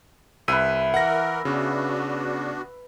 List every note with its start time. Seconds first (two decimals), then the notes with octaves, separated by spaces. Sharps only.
0.48 C2 B4 E5 D#7
0.94 E3 A#4 F#5 A#6
1.45 C#3 B3 D4 F#4